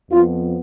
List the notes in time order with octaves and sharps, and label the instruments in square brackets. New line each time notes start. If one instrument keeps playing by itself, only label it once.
[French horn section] F2 F3 B3 F4